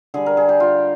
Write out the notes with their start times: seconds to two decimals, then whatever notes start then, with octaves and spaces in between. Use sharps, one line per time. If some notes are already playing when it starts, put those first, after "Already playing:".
0.14 D3 G3 G#4
0.26 A#4
0.37 G#4
0.49 G4
0.60 F4